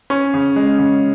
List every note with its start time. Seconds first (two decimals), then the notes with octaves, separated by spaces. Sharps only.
0.10 C#4
0.34 C#3
0.56 G#3
0.79 C#3